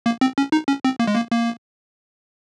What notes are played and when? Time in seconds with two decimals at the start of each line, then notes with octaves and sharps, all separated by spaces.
0.06 A#3
0.21 C4
0.38 C#4
0.52 D#4
0.68 C#4
0.85 C4
0.99 A#3
1.07 G#3
1.15 A#3
1.31 A#3